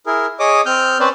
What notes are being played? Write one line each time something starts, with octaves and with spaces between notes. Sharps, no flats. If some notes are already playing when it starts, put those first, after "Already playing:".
E4 G#4 A#4
G#4 C#5 D#5 D6 D#6
C4 F6 G6
C4 C#4 B4 C5 D5